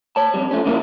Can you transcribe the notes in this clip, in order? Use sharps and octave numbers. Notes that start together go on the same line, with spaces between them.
C#5 A5
F2 G3
F3 A3 C#4
C#3 G3 A#3 E4 G#4 A#4